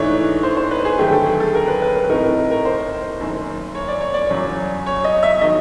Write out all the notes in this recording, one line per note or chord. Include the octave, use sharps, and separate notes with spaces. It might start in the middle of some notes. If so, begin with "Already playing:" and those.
Already playing: G#2 E3 A3 D4 C#5
C5
C5
B4
G#4
D#2 D3 F#3 A3 G4
A4
G#4
A4
A#4
B4
B4
A#4
A2 E3 A3 C4 D#4 A#4
A#4
A#4
C5
F#1 F#2 D#3
C#5
D5
C#5
D5
E2 C#3 F#3 C#5
C#5
D#5
E5
D#3 F#3 D#5